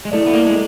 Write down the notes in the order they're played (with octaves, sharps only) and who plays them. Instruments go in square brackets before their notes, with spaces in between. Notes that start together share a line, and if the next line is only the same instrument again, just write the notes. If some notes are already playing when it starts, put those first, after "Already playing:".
[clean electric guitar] G#3
[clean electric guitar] A3 [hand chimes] E4 A4 D5
[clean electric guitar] B3
A#3
G#3